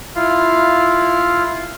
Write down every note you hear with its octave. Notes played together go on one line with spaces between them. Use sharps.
E4 F4 F5